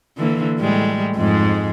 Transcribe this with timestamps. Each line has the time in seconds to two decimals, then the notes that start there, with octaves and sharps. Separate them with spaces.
0.17 D3 E3 A#3
0.59 A2 G3 G#3
1.16 F2 G#2 G#3